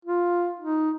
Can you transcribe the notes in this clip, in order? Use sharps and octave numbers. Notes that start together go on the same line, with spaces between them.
F4
D#4